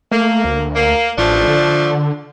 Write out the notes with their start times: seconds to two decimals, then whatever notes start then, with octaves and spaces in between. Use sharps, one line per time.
0.11 A3 A#3
0.44 D2
0.76 A#3
1.18 A1 F3 A3 D4
1.48 D3